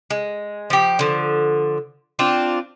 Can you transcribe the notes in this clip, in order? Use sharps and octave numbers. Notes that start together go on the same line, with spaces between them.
G#3
F3 G4
D3 F3
C4 D4 F4